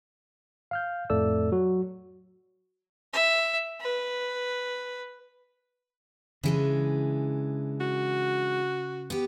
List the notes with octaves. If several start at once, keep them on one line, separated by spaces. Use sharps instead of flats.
F5 F6 G6
F2 A2 A3 A4 D5 E6
F#3 F#4
E5
B4
C#3 E3 G#3 D4
F#4
B3 G4